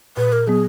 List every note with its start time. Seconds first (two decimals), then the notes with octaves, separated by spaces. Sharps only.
0.17 A#2 B4
0.32 A#4
0.47 F#3 B3 G#4